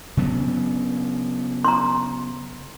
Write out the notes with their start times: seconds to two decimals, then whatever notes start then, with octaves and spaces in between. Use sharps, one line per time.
0.17 C#3 F#3 B3
1.65 A#5 C6